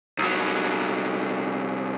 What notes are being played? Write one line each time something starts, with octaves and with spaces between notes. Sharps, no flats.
C2 F#3